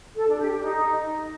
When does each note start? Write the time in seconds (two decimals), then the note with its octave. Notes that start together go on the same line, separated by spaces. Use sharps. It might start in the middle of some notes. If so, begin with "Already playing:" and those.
0.16 A4
0.27 D4
0.38 G4
0.50 G4
0.61 D#4